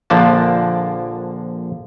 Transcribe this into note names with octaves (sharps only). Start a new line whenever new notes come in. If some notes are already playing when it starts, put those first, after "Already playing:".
A#1 D3 F3 A#3 D4 A5